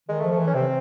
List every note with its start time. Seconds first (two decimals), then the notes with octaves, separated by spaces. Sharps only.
0.09 D#3 G#3
0.20 A3
0.24 F3
0.32 A3
0.39 E3
0.47 C#4
0.54 C3 C4